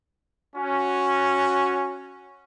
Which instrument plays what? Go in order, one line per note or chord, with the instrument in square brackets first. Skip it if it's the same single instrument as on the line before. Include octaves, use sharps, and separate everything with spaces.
[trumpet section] C#4 F#4